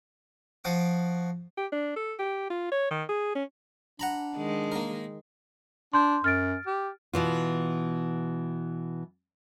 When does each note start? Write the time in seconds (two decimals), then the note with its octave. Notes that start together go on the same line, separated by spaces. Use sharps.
0.64 F3 F#4 D6 D#6
1.57 G4
1.72 D4
1.96 A4
2.19 G4
2.50 F4
2.71 C#5
2.91 D#3
3.09 G#4
3.35 C#4
4.00 D4 F#5 A#5 B5
4.36 D#3 G#3
4.72 A#3 A#4
5.93 D4 C6 G6
6.24 F#2 F6 A6 D7
6.67 G4
7.13 B2 E3 F4